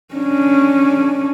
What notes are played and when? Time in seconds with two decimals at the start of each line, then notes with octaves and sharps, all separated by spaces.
0.14 C#4 D4